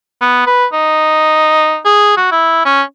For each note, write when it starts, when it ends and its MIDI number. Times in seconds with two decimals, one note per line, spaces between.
0.21 0.43 59
0.46 0.66 71
0.73 1.79 63
1.85 2.16 68
2.17 2.28 66
2.32 2.63 64
2.65 2.82 61